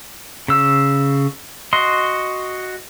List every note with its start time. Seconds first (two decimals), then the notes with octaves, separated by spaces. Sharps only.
0.48 C#3 E6
1.73 F#4 D#5 C6